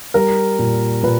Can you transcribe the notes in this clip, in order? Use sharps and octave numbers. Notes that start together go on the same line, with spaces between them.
G3 A#4
A#2
A#2 B4